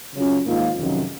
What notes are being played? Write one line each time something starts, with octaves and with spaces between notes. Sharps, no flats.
C#3 F#3 C#4 F4
G#2 D#3 A#3 F4
F2 C3 D#3 F#3 C#4